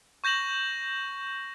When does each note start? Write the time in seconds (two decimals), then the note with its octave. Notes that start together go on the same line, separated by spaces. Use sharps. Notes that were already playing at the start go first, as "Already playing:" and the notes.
0.24 C#6 G6 A#6 E7 F#7